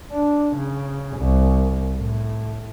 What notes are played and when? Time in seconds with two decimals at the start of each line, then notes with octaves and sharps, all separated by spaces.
0.11 D4
0.55 C#3
1.17 C2
1.95 A2